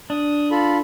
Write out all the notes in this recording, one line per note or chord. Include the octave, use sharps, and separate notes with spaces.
D4 D#6
F4 A4 B5